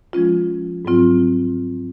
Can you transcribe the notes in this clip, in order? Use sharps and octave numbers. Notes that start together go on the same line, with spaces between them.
F3 G#3 C#4 F4
G#2 F#3 C4 F4